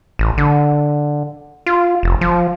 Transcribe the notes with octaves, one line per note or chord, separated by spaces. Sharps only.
A1
D3
F4
F1
F3